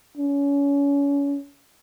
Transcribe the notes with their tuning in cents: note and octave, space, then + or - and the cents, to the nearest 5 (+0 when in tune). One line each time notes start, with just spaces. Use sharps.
C#4 +30